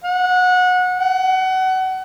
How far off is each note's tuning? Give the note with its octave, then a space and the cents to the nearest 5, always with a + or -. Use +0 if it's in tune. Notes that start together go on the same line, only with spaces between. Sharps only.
F#5 -25
F#5 +25